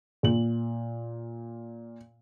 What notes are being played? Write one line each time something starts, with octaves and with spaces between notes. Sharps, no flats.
A#2 F#7